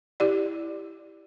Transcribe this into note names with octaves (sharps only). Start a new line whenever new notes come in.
E4 G4 D5